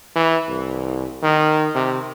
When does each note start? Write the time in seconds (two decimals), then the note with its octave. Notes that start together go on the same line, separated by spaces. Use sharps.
0.16 E3
0.49 C2
1.23 D#3
1.75 C3